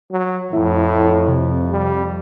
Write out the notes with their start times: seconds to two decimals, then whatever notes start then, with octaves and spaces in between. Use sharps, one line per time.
0.11 F#3
0.53 F2 A2 E4
1.28 C3
1.71 G3